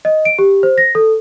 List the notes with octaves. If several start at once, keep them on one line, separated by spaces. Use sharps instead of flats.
D#5
D7
G4
C5
A#6
A4